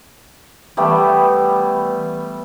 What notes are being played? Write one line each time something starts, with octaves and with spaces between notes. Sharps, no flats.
E3 G3 A3 B3